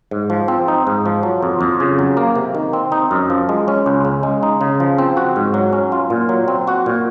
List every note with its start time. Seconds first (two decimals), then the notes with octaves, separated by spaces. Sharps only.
0.11 G#2
0.30 F3
0.48 C4
0.68 D#4
0.87 G#2
1.06 F3
1.23 F#3
1.43 F2
1.61 F2
1.80 C#3
1.99 F#3
2.17 A#3
2.36 C3
2.55 D#3
2.73 C4
2.92 D#4
3.11 F#2
3.30 F3
3.49 G#3
3.68 C#4
3.86 C#2
4.05 C#3
4.23 G#3
4.43 D#4
4.61 C#3
4.80 F3
4.98 C4
5.17 F#4
5.36 G#2
5.54 F#3
5.73 C#4
5.92 F4
6.10 A#2
6.29 F#3
6.48 C4
6.68 F#4
6.86 A#2